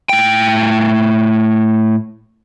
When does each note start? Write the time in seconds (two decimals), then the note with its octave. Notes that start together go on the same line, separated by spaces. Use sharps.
0.09 A2 G5